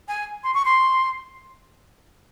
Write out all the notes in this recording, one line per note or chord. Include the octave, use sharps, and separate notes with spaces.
G#5
C6
C#6
C6